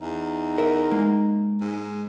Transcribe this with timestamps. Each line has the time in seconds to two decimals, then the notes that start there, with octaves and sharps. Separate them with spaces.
0.01 E2 D#4
0.58 A#4 E5
0.91 G#3 A#3
1.61 G#2